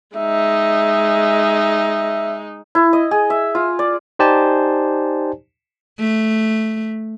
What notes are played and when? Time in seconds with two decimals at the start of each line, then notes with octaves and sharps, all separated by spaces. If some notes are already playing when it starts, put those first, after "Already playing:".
0.16 G#3 D#4 E5
2.75 E4
2.93 D#5
3.11 G#4
3.30 E5
3.55 F4
3.79 D5
4.19 D#4 G4 C5 D5 G#5 A5
5.99 A3